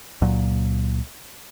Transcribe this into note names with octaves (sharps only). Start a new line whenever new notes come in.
C#2 A#2 F#3